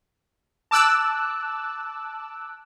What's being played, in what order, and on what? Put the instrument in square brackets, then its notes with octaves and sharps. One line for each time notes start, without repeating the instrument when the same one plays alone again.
[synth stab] A5 D6 E6 F#6